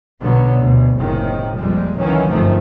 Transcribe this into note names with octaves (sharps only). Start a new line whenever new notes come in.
B1 B2 D3 F#3 B3
D2 B2
F#1 C#2 A2 C3 D#3
A#1 F2 A#2 G3 G#3
C#2 D#3 E3 F#3 C#4
G1 F#2 C3 D#3 F3 A3